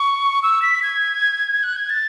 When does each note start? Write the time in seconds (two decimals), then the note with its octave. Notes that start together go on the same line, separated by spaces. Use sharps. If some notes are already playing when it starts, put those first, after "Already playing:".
Already playing: C#6
0.43 E6
0.62 B6
0.83 G#6
1.63 F#6
1.76 G#6
1.90 A6